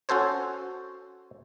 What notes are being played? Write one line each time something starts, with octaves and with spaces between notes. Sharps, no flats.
C#4 F#4 A4 C5 C#5